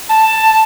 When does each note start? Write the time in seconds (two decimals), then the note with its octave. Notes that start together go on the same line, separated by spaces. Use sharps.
0.09 A5